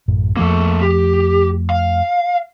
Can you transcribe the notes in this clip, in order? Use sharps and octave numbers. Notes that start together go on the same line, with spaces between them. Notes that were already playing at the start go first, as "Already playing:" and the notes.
A1 F#2 A2
F2 F3 A3 A#3 A4
G4
F5